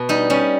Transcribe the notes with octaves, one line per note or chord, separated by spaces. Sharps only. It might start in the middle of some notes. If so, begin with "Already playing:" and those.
Already playing: B2
G3 D#4
G3 C#4